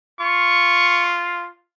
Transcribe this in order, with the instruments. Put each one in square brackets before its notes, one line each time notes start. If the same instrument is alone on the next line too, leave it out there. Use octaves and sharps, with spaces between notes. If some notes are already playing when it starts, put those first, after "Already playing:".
[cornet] F4 [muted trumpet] C#6